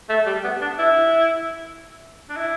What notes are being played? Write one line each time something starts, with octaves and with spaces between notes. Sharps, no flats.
A3
G3
B3
D4
E4
D4
E4